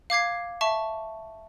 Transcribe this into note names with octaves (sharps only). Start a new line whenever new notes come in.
F5 D6 G#6 C7
E5 A5 C#6